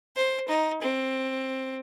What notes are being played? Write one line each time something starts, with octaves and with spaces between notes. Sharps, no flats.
C5
D#4
C4